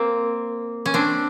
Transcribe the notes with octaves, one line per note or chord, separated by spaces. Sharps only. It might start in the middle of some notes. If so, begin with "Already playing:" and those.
Already playing: A#3 C4
C#4
C4 D4